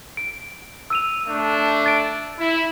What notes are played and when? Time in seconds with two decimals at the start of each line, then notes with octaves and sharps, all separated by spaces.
0.17 D7
0.90 E6 D#7 F7
1.28 A3 D4
1.86 A6 D7
2.39 E4